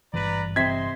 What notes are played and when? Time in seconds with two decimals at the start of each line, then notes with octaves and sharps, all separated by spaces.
0.14 G#1 G2 E3 B4 D5 A#5
0.56 C3 C5 D#5 E5 C6 G#6 B6